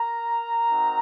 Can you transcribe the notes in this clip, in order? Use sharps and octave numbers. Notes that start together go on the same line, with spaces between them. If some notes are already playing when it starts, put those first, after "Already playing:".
Already playing: A#4 A#5
C4 D#4 F#4